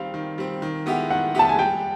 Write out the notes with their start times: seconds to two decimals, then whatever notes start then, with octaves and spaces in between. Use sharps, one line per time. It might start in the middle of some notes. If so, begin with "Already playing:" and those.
Already playing: D#3 G3 C4 F5
0.14 D#3
0.38 G3 C4
0.62 D#3
0.86 G#3 B3 E4 G4
1.10 D#3 F#5
1.35 G#3 B3 E4 G4 A5
1.49 G#5
1.59 G3 G5